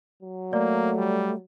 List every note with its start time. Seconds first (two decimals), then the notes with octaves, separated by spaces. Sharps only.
0.22 F#3
0.53 A3 A#3 D5
0.97 G3